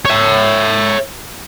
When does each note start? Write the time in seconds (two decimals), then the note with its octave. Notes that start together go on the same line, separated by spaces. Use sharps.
0.05 C#5 E5